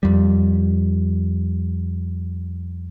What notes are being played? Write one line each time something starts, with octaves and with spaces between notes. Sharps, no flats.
F2 G3